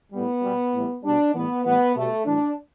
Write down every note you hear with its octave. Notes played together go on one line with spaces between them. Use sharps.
A2 G3 B3
B2 G3
A2 E3 G3
B2 G3 D4
A2 E3 G3 B3
A2 E3 G3 B3
B2 G3 A3
A2 E3 G3 D4